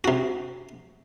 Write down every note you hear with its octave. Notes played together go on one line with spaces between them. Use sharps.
C3 F#4